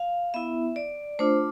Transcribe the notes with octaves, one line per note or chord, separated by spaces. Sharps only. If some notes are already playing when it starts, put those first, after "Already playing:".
Already playing: F5
B3 E4 E5
D5
A3 D4 F4 C5